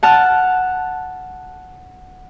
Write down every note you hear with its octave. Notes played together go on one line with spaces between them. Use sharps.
F#5 A5 F6